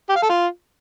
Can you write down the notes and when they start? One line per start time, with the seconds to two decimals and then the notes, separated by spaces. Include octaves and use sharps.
0.09 G4
0.16 F5
0.23 A4
0.29 F4